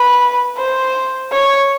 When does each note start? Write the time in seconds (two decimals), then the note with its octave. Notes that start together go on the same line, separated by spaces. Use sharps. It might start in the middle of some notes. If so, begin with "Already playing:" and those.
Already playing: B4
0.57 C5
1.32 C#5